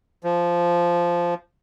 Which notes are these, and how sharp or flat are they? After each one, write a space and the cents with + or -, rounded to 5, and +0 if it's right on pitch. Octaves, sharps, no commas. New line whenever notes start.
F3 -10